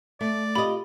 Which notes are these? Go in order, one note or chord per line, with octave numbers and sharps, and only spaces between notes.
A3 D5
F4 G4 D#5 B5